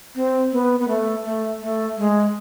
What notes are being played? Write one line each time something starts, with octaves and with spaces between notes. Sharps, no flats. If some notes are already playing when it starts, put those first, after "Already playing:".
C4
B3
B3
A3
A3
A3
G#3